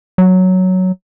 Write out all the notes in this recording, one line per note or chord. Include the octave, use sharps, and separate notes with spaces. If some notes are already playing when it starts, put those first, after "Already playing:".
F#3